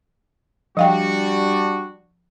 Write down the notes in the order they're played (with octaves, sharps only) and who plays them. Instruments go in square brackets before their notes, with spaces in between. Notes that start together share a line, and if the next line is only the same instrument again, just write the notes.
[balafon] F3 F5 G5 [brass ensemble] G3 D4 F#4